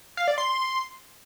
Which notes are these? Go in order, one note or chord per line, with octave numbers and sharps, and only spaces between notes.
F5
D5
C6